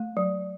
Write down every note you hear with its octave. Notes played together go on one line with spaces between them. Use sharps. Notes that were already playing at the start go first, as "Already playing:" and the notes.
Already playing: A3
F#3